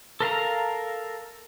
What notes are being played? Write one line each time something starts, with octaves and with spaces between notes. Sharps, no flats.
A4 A#4 F5 A#5